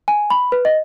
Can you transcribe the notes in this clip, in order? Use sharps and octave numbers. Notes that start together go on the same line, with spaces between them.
G#5
B5
B4
D#5